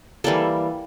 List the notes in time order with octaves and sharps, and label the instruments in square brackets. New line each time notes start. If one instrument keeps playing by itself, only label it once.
[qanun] E3 G3 A#3 A4